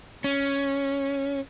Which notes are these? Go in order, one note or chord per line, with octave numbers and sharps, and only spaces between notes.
C#4